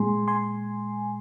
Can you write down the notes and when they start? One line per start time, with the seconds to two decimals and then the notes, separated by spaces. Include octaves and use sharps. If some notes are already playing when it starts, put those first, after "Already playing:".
Already playing: A#2 G#3 G#5 C6
0.28 G#5 C6